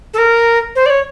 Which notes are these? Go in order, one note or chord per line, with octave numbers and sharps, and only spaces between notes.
A4
A#4
C5
D5
C#5